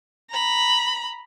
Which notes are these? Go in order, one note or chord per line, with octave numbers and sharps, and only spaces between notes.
A#5 B5